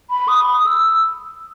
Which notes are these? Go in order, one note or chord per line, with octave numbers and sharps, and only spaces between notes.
B5
D#6
D#6
E6